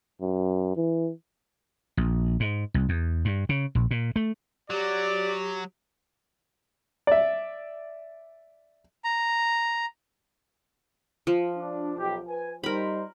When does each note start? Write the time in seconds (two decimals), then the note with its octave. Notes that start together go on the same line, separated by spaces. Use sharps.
0.21 F#2
0.76 E3
1.97 A#1
2.40 G#2
2.74 C2
2.89 E2
3.25 G2
3.49 C#3
3.75 A#1
3.91 A#2
4.16 A3
4.70 F#3 G4 D5
7.07 D5 E5
9.04 A#5
11.27 F3
11.57 D4
11.98 B1 G4
12.27 B4 G#5
12.64 G3 D#4 A#4 C5 B5